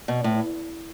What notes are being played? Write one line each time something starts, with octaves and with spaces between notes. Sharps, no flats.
B2
A2